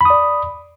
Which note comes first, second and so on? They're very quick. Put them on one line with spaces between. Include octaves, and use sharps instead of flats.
B5 D#6 D5